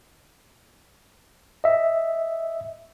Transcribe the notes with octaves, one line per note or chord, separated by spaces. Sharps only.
D#5 E5